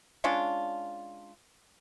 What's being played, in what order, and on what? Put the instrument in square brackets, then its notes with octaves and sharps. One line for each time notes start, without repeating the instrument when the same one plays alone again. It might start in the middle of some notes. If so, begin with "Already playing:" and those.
[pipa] G#3 C#4 D4 F4